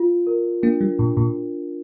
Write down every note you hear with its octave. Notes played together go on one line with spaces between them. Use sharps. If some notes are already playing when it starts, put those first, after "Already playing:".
Already playing: F4
A#4
A#3 D4
G3
A#2 D4
A#2